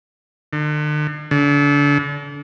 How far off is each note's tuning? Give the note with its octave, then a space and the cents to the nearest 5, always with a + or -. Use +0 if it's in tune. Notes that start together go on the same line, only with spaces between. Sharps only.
D3 +45
D3 -35